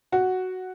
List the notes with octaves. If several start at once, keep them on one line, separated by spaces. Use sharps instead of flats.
F#4